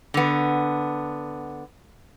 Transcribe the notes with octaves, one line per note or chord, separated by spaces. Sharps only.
D3 B3